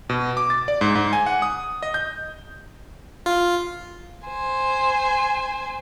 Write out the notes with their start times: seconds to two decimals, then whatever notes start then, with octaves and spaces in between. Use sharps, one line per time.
0.09 B2
0.37 D6
0.50 A6
0.68 D5
0.81 G#2
0.95 G#2
1.13 G#5
1.26 F#5
1.42 D#6
1.83 D#5
1.94 G6
3.26 F4
4.27 C5 G#5